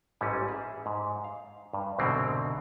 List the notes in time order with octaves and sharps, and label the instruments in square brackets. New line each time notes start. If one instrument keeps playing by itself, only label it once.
[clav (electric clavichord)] A1 G#2 E3 G3 C#4
G#4 E5
G#2
F5
G2
C2 G#2 B2 D3 F#3 C4